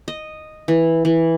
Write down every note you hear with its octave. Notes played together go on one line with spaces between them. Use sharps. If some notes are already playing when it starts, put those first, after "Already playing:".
D#5
E3
E3